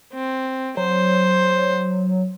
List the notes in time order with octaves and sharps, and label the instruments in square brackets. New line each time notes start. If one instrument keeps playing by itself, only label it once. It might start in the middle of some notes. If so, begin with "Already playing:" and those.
[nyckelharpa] C4
[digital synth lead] F#3 [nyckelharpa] C5